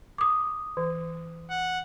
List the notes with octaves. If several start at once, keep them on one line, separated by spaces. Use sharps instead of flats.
D6 D#6
E3
F#5